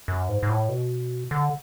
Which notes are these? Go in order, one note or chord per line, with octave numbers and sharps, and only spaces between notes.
F#2
G#2
G#2
A2
B2
D3